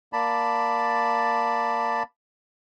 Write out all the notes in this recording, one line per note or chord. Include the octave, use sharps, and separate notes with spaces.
A#3 D5 A5 B5